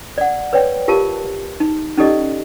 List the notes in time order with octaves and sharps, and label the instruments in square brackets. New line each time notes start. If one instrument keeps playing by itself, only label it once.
[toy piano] D5 F#5
B4 C#5 D5 G5
F4 G4 A#4 F5 A5
D#4
C#4 D#4 G4 A4 D5 D#5